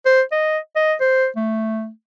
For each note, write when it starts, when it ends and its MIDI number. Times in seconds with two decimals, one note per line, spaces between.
0.06 0.22 72
0.32 0.58 75
0.76 0.94 75
1.00 1.27 72
1.36 1.89 57